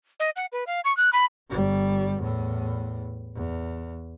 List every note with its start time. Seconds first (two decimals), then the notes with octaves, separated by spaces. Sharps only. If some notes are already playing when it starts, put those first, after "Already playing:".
0.20 D#5
0.36 F#5
0.52 B4
0.67 F5
0.85 C#6
0.97 F#6
1.13 B5
1.50 G1 G3
2.19 E2 A2
3.36 E2